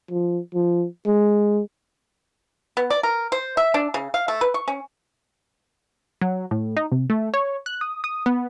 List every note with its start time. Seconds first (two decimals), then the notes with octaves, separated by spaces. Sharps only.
0.11 F3
0.54 F3
1.06 G#3
2.77 B3
2.90 D5
3.03 A#4
3.32 C5
3.57 E5
3.74 D4
3.94 C#3
4.14 F5
4.28 A3
4.41 B4
4.54 C#6
4.68 C#4
6.21 F#3
6.51 A2
6.77 D#4
6.92 C3
7.10 A3
7.34 C#5
7.66 F#6
7.81 D#6
8.04 D#6
8.26 B3